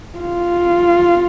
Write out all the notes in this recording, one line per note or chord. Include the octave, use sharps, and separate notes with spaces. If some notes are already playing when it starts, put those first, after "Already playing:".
F4